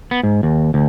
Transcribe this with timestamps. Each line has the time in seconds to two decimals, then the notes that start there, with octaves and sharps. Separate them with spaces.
0.11 B3
0.23 G#2
0.43 D#2
0.74 D2